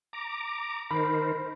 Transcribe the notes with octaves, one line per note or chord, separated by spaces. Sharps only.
A#5 D6
D#3 A#4 C5 B5